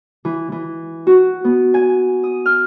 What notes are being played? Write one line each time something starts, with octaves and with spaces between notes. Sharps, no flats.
E3
E3
F#4
B3
G#5
D#6
F6